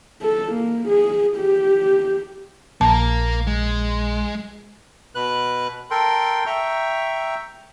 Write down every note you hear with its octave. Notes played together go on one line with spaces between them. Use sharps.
A4
A#3
G#4
G4
A#1 A#3 A#4 A5
G#3
B2 B4 F#6
A4 A#4 G5 C6
E5 G5 A#5 C#6